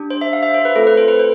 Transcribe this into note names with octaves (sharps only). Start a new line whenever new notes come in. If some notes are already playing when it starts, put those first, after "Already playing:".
Already playing: D4 G4
C5
E5
F5
E5
C5
B4
A3 C4 F4 A4
B4
C5
B4
C5